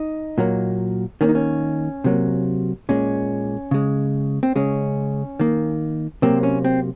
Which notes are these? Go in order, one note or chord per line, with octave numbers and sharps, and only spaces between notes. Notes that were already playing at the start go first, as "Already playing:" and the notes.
Already playing: D#4
A#2 F#3 A#3
D#3 A#3 C#4
D#4
C#4
C3 F#3 A#3
A#2 G#3 C#4
C#3 G#3
C4
C#3 G#3 C#4
D#3 A#3
C3 F#3 A#3 C4
C#4
C4